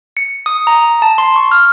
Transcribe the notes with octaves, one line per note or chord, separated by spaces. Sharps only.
C#7
D#6
A#5
A5
C6
C#6
F6